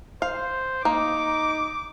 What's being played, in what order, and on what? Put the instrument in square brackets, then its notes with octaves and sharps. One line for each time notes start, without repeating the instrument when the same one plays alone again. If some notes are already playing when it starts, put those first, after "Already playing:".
[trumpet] C5 [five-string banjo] F5
[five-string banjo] A#3 [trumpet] D#4 [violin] D6